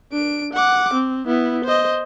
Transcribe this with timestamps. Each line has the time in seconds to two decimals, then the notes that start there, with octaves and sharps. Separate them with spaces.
0.12 D4 D7
0.53 F#5 D6
0.94 C4
1.27 B3 E4
1.65 C5 D#5